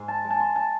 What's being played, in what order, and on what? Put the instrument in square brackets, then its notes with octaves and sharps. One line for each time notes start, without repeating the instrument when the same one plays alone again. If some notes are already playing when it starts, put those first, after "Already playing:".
Already playing: [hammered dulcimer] G#2 C6
A5
G#3
A5
C6
A5